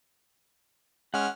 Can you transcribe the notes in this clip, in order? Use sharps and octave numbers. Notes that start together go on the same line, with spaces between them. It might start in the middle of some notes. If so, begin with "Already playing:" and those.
G#3 C#4 F#5 F6